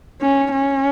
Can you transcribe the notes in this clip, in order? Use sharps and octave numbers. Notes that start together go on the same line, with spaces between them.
C#4
C#4